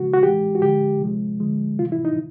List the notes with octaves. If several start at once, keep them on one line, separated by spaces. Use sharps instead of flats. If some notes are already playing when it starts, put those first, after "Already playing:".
Already playing: C#3 F3 G#3 F#4
F#4
A2 E3 G#3 G4
F#4
D3 F3 G#3 G4
C3 F3 G#3
D3 F3 G#3
C3 E3 G3 F4
E4
D#4